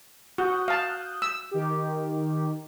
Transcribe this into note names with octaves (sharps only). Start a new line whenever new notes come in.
F#4 D#6 F#6 G6
F5 A5
E6
D#3 G4